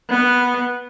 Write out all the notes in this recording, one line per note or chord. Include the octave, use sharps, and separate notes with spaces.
B3